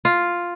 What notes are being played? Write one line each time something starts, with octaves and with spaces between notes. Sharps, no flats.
F4